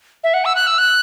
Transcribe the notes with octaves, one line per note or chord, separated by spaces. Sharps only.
E5
F#5
E6
F#6
E6
F#6